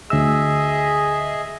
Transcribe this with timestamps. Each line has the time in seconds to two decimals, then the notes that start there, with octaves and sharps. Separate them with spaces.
0.10 D2 G#4 D#5 E5 E6